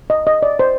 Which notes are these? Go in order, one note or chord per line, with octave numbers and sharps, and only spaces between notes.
D#5
D#5
D5
C5